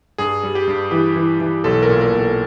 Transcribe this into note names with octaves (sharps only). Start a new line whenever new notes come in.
G2 G#4
G3
G4
G2
E3 G4
E3
E3
B1 A4
A#4
A#2
A#4
B1
A4